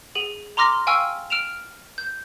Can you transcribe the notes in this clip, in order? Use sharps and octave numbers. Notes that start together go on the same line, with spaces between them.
G#4 D#7 F#7
A#5 C6 D6 F6 A#6
F5 G5 G#5 C#6 E6 F6
F6 D7 E7 F7
G6